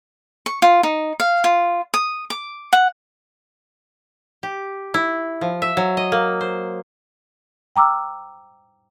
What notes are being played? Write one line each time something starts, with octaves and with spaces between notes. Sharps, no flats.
C#6
F4
D#4
F5
F4
D#6
D6
F#5
G4
E4
F3
E5
F#3
D#5
A#3
C5
G5 A#5 D6 E6 F6